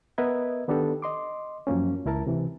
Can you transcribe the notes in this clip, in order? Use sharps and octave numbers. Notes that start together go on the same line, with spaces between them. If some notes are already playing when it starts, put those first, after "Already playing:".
B3 A#4 B4 D#5 E5 G#6
D#3 B3 D4 G4 A4
D#5 C6 D6
F#2 F3 A#3 C#4
C#2 E4 A#4 A5
C3 E3